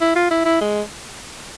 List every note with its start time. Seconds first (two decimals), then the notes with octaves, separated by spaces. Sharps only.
0.01 E4
0.16 F4
0.31 E4
0.45 E4
0.61 G#3